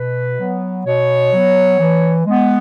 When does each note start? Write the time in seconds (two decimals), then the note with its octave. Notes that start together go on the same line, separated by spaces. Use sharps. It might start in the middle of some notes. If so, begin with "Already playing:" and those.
Already playing: B2 B4
0.39 F#3 B3
0.86 B2 C#5
1.32 F#3 B3
1.79 E3
2.26 G#3 B3